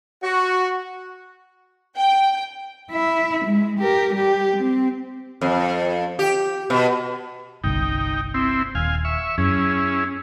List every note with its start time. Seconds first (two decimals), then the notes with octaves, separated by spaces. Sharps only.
0.22 F#4
1.97 G5
2.91 E4 E5
3.45 G#3
3.79 G4 A#4
4.13 G3 G4
4.56 C4
5.41 F2
6.19 G4
6.70 B2
7.64 G1 C2 D#4 G5
8.34 C4 E4
8.75 D#1 F5 G#5
9.05 E5 C#6
9.38 F#2 C#4 E4 G#4